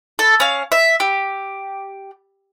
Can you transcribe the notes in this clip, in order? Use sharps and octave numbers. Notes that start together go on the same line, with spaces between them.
A4
C#4 F5
E5
G4